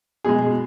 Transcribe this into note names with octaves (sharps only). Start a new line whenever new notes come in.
B2 G#3 G#4